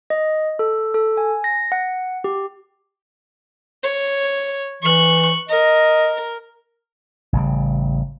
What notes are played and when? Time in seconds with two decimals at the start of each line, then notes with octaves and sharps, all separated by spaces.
0.10 D#5
0.59 A4
0.94 A4
1.17 G#5
1.44 A#6
1.72 F#5
2.24 G4
3.83 C#5
4.82 E3 C#6 F#6
5.49 A#4 D#5
7.33 A1 C#3 G3